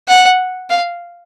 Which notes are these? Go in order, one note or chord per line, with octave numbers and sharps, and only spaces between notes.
F#5
F5